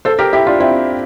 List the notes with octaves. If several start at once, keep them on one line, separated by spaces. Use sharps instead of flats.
A4 C5
G4 A#4
E4 G4
D4 F4
C4 E4